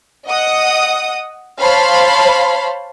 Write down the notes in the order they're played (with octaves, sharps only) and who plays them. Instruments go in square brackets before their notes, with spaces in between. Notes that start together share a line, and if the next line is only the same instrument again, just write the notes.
[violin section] D#5 F#5 D#6
C5 C#5 F5 A5 B5 C6